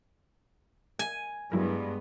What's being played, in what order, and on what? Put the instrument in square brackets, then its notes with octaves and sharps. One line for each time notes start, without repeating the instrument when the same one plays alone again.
[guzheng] G#5
[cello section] G2 [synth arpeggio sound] F#3 E4 A#4 [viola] G#3 B3